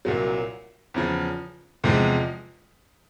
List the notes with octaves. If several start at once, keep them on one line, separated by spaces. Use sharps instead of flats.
C2 A#2 F#3
E2 C#3 F3
E2 C3 F3 G#3